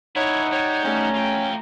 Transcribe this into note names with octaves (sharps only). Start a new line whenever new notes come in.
C#4 D#4 E4 C#5 F#5
G3 C#5
A3 C#4 A#5
F4 G5